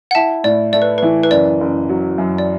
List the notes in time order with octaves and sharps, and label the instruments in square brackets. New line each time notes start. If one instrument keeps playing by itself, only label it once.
[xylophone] F#5
[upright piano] E4 [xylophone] E5 A5
[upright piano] A2 [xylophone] D5
[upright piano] A3 [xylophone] D5
[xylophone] B4
[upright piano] E3 [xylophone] B4
[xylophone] B4
[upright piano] F#1 [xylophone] D5
[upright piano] F#1
F#3
F#2
[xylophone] D5